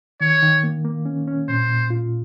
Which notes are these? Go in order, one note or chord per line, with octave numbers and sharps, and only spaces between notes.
D#3 C#5
D#3
A#3
A#3
C#4
C#4
A#2 C5
A#2
F4